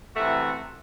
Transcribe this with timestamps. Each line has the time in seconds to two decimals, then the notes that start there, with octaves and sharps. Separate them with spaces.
0.16 C3 E3 A3 F#4